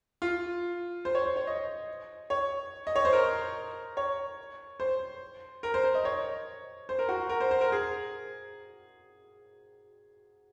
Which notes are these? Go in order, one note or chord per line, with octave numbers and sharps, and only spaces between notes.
F4
C5
C#5
C5
C#5
D#5
C#5
D#5
C#5
C5
A#4
C#5
C5
A#4
C5
C5
D#5
C#5
C5
A#4
F#4
A#4
C5
C5
A#4
G#4